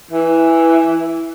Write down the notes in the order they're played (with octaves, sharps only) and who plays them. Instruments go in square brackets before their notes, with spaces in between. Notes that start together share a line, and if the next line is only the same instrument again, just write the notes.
[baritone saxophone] E3